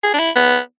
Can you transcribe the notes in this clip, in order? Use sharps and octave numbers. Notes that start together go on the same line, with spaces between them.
G#4
D4
E4
B3